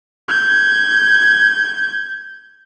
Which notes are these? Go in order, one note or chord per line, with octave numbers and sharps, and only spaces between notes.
G6 G#6